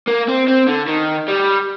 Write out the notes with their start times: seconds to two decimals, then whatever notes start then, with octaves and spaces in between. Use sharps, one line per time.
0.07 A#3
0.28 C4
0.48 C4
0.67 D3
0.88 D#3
1.28 G3